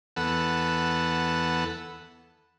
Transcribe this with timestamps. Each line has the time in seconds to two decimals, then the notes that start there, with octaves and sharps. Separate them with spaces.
0.16 E2 B3 A4 F#5 E6